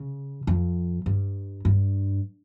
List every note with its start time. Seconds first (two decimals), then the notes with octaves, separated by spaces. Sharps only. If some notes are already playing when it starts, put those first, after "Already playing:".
Already playing: C#3
0.47 F2
1.06 G2
1.65 G2